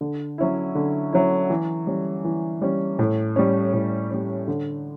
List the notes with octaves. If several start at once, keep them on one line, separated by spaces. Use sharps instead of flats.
D3
F#3 C#4 E4
D3
F#3 C#4 E4
E3
G3 C#4
E3
G3 C#4
A2
G3 C#4
A2
G3 C#4
D3